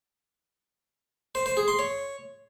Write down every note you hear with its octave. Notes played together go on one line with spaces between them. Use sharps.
C5
C5
G#4
C6
C#5